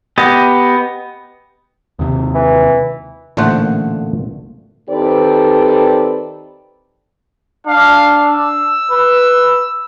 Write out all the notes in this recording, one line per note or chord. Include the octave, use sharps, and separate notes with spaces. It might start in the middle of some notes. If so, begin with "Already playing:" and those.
B3 G4 D#5
D#2 C3
E3
A1 A#2 D3 A3 C5 F#5
D#3 C4 G4 A4 B4 D5
D4 F5
E6
B4